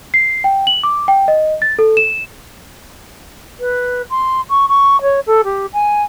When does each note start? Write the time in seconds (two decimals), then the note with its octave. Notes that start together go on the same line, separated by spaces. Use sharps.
0.14 C7
0.44 G5
0.67 F#7
0.83 D6
1.08 G5
1.28 D#5
1.62 A6
1.79 A4
1.97 E7
3.60 B4
4.10 C6
4.50 C#6
4.69 C#6
5.02 C#5
5.27 A4
5.44 G4
5.73 G#5